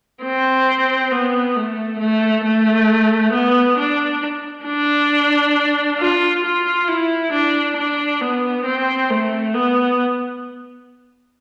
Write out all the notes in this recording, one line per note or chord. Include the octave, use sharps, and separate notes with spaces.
C4
B3
A3
A3
A3
B3
D4
D4
F4
F4
E4
D4
D4
B3
C4
A3
B3